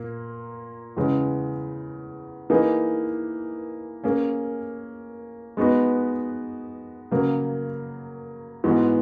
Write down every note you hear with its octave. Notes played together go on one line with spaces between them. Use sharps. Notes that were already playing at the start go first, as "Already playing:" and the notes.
Already playing: A#2 A#3
E2 C#3 G#3
E3 A#3 D#4 G#4 B4
A#3 C#4 G#4
G#3 B3 D#4 F#4 B4
C#3 F#3 A#3
G#2 E3 G#3 B3 F#4